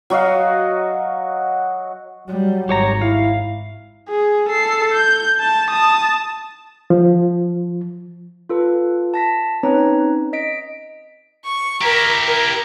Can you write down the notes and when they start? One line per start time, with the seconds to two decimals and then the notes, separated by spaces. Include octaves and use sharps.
0.10 F#3 F#4 D#5 F5
2.28 F#3 G3
2.69 G#1 G4 C#5 A#5
3.02 E4 F5
4.09 G#4
4.49 A4 C7
4.93 G6
5.40 A5
5.71 A5 D#6
6.90 F3
8.49 F4 A4 B4
9.14 A5 A#6 B6
9.63 C4 C#4 D#4 B4 C#5 A#5
10.33 D#5 B6 D7
11.45 C#6
11.81 E4 G4 A#4 A#5
12.25 A#4